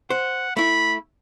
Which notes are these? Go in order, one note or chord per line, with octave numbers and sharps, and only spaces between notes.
C5 F#5
A3 E4 B5